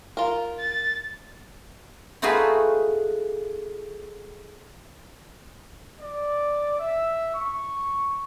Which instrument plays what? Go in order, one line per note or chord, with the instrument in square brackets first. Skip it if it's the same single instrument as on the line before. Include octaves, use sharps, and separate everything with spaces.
[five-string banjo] F4 A#4
[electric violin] A6
[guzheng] A3 D#4 F4 F#4 G#4 B4
[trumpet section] D5
E5
C#6